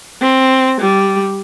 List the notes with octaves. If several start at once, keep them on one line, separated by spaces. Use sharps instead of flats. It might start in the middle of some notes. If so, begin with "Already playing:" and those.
C4
G3